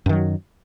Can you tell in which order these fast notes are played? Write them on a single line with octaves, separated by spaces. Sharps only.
F#2 D#3 F#3